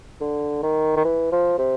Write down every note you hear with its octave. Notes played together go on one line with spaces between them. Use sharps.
D3
D#3
D#3
E3
F3
C3